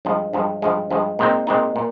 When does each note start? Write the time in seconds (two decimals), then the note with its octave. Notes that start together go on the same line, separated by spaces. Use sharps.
0.05 G2 F3 G#3
0.33 G2 F3 G#3
0.62 G2 F3 G#3
0.91 G2 F3 G#3
1.19 A#2 G#3 C4 D#4
1.47 A#2 G#3 C4 D#4
1.76 A#2